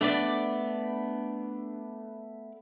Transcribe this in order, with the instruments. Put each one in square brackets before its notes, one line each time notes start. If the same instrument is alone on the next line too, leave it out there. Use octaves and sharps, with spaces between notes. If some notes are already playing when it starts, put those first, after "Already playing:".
[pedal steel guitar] A3 B3 D5 [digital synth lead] D4